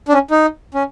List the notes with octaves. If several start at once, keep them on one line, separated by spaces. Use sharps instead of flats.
D4
C#4
D#4
C#4